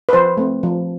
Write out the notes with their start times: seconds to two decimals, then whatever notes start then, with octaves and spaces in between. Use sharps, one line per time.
0.09 B4
0.13 F3 C5
0.37 A3 C4
0.63 F3